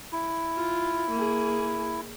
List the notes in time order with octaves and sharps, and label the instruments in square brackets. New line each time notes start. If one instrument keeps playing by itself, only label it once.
[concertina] E4
[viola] F4
A#3 G#4